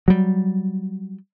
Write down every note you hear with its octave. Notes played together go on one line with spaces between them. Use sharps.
F#3 G3